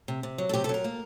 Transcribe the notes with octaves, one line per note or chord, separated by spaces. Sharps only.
C3
C3
F#3
A4
C3 G4
A4
F#3 A#4
A#3